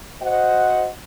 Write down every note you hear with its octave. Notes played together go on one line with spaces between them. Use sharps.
F#4 C5 D#5 F#5